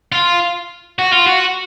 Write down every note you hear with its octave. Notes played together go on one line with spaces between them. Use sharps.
F4
F#4
F4
F#4